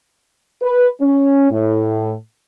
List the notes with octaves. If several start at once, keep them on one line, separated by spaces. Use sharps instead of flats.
B4
C#4
A2